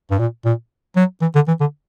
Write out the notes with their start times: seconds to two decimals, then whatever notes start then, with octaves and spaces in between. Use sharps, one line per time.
0.11 G2
0.19 A#2
0.45 A#2
0.96 F#3
1.22 E3
1.35 D3
1.48 E3
1.60 D3